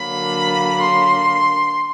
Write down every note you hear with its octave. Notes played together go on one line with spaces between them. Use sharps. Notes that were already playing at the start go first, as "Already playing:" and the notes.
Already playing: D3 F#3 A#3 B5
C6